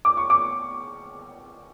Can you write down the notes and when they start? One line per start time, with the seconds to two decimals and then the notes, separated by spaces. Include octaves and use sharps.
0.05 D6
0.17 C#6
0.30 D6